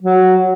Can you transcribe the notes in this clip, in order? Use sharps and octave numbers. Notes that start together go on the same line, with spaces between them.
F#3